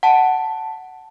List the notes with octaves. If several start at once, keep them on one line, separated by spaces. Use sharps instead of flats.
F#5 A5